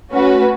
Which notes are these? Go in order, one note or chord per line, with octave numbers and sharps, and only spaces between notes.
A3 C#4 F#4 B4